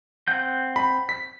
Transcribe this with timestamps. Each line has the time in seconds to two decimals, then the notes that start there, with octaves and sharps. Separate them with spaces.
0.28 C4 F#5 G6
0.76 B5
1.09 B6